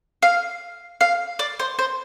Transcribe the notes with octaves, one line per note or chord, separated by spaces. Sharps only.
F5
F5
D5
C5
C5